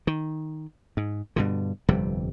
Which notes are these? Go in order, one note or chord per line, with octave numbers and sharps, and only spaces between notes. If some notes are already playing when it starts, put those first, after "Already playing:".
D#3
G#2
G2 B2 D3
G1 F2 C3 G3